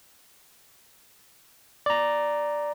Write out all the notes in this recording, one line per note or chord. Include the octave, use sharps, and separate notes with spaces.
D5 A#5